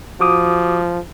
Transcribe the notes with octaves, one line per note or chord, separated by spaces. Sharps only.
F3 F#4 D6 D#6